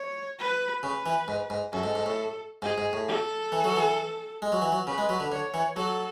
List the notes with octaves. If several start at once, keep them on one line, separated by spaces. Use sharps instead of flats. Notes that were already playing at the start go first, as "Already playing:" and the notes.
Already playing: C#5
B4
C#3 B4
E3
G#2
G#2
F#2 A4
G#2
G#2
A2
G#2 G#4
G#2
A2
A4
E3
F#3
E3
G#3
F#3
E3
F#3
C#3 B4
G#3
F#3
D3
D3 C#5
E3
F#3 A4